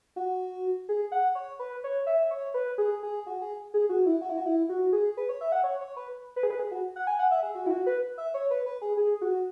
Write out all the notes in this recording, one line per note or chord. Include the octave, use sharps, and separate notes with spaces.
F#4
G#4
F#5
C#5
B4
C#5
E5
C#5
B4
G#4
G#4
F#4
G#4
G#4
F#4
E4
F#4
E4
F#4
E4
F#4
G#4
B4
C#5
E5
F#5
C#5
C#5
B4
B4
G#4
B4
G#4
F#4
F#5
G#5
F#5
E5
G#4
F#4
E4
F#4
B4
E5
C#5
B4
B4
G#4
G#4
F#4